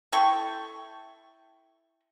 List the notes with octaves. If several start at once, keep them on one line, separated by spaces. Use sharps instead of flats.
E4 A4 G5 C#6